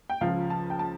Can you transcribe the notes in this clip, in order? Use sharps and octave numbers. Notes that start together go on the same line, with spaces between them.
G5
C#2 C#3 F3 F5
A5
G5
A5